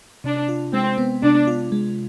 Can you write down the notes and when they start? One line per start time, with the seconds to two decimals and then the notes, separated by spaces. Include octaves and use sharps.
0.24 C3 D4
0.48 F4
0.73 G#3 C4
0.98 B3
1.22 C3 D4
1.47 F4
1.72 G#3